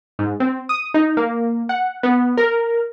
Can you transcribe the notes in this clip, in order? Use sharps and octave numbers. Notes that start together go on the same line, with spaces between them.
G#2
C4
D#6
D#4
A#3
F#5
B3
A#4